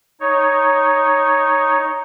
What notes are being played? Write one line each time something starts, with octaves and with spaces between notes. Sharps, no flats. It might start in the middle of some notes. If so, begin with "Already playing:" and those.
D#4 C#5